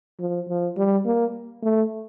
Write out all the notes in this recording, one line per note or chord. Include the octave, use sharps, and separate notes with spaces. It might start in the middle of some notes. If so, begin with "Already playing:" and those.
F3
F3
G3
A#3
A3